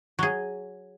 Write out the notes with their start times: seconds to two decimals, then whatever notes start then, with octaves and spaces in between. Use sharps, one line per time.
0.19 F#3 G#4